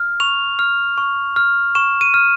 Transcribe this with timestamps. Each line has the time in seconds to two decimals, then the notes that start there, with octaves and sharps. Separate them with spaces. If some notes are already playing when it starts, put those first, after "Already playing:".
Already playing: F6
0.20 C#6 F7
0.59 F6
0.98 C#6
1.36 F6
1.75 C#6 E7
2.01 D#7
2.14 F6